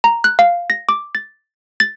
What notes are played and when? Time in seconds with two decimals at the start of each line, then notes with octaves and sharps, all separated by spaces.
0.04 A#5
0.24 F#6
0.39 F5
0.70 A#6
0.89 D6
1.15 A6
1.80 A6